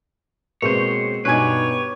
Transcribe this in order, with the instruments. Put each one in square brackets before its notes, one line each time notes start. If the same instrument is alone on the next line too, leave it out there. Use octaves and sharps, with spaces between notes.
[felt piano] B2 G#3 C4 [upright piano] A#3 [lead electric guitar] C5 C#5
[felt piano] G2 D#4 [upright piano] B2 G#5 G#6 [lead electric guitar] G4 B4 [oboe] C#5